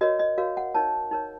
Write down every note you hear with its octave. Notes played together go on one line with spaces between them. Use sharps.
F#4 A#4 C#5 D#5
D#5
F#4 A#4 C#5 F5
F#5
D#4 A#4 C#5 A5
D#4 A#4 C#5